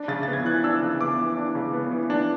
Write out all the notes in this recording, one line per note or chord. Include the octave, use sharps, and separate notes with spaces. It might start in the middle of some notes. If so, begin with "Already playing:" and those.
Already playing: D4
C#3 A6
B3 A6
G#6
E3 F#6
D4 E6
C#3
B3 D6
E3
D4
C#3
B3
E3
D4